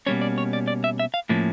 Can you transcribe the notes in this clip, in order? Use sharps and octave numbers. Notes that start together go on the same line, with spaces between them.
B2 G3 A#3 C#4 C#5
D5
C#5
D5
D5
E5
E5
F5
A2 F3 A#3 C#4